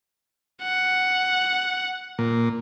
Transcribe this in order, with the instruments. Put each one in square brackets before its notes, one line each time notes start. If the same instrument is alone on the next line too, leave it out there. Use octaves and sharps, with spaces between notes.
[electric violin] F#5
[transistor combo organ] A#2